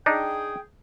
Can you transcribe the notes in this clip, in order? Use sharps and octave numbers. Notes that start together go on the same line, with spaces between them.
D4 D#4 G#4 G5